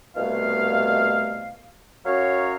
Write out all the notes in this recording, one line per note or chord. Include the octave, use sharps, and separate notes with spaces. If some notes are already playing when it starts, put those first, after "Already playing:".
C2 B2 A3 F5
F#2 F#3 F#4 C#5 F5